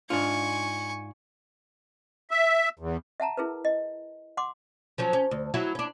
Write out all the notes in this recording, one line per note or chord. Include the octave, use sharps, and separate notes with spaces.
G#2 D4 F4 G#5 C#6
E5
E2
E5 F#5 A5 A#5
E4 G#4 A#4 B4
D#5
F#5 C6 D6
F3 F#3 C#4
C#4
D2
F#3 E4 F#4
C#4 D4